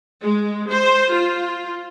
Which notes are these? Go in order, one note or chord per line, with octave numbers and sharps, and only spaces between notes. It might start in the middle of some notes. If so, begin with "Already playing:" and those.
G#3
C5
F4